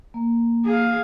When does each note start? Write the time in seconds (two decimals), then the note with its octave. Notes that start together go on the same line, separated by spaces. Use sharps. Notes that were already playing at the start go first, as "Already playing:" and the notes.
0.14 A#3
0.65 G#4 F5